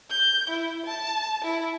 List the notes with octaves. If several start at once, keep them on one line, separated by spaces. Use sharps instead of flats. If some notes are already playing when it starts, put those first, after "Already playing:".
G6
E4
A5
E4